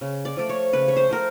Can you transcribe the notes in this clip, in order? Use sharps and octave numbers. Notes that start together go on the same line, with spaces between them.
C#3
D5
F3 A3 D5
C#5
C#3 B4
C#5
C5
F3 A3 A#4